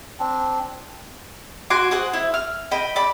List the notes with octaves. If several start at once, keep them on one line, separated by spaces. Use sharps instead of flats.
C4 D4
F#4 G#5 C6 D6
G#4 C5 F#5
E4
F6
D#5 G5 B5
D5 B5